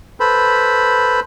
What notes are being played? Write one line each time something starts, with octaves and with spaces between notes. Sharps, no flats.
A4 B4 C5 B5